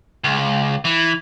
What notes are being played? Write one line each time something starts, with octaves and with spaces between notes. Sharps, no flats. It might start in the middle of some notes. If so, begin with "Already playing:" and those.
C#2
E3